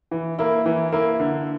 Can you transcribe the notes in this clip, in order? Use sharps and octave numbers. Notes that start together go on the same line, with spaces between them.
E3
A#3 E4
E3
A#3 E4
D3